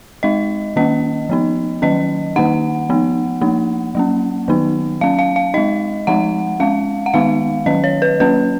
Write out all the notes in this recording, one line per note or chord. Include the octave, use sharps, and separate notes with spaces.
G#3 D#4 D#5
D#3 A#3 C#4 D#5
F3 B3 D#4
D#3 F#3 C#4 D#5
D#3 A#3 D#4 F#5
F3 B3 D#4
F3 A#3 D#4
F#3 A#3 C#4
D#3 F#3 B3 D#4
F#3 C#4 F5
F5
F5
G#3 D#4 D#5
F3 G#3 D#4 F#5
G#3 C#4 F5
F#5
D#3 G#3 B3 D#4 F5
D#3 F#3 C#4 D#5
C#5
B4
F#3 A#3 C#4 B4